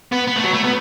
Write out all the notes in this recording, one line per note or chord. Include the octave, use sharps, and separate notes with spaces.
B3
B3
A3
F#3
A3
B3